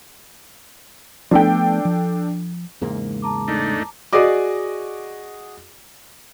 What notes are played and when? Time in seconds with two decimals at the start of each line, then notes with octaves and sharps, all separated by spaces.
1.31 F3 A3 B3 D4 A4 G5
1.85 F3
2.81 E2 G#2 C#3 G#3 A#3
3.22 A5 A#5 D6
3.48 A3 D4 D#4
4.13 F#4 G#4 D5 D#5 D6